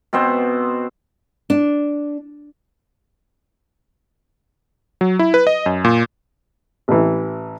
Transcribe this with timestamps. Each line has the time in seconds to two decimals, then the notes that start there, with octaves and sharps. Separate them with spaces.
0.13 B2 B3 C4 C5
1.50 D4
5.01 F#3
5.19 E4
5.34 B4
5.47 D#5
5.66 F#2
5.84 A#2
6.88 A1 E3